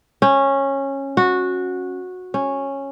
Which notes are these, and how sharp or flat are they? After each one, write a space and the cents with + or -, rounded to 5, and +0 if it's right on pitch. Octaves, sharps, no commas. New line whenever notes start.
C#4 -15
F#4 -15
C#4 -10